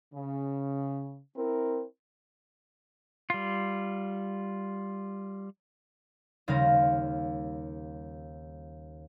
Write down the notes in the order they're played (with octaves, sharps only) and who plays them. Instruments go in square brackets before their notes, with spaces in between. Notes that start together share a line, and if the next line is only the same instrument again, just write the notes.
[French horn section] C#3
C4 E4 A#4
[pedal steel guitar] G3 F4
[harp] D#2 C#3 G3 C4 F5 A#6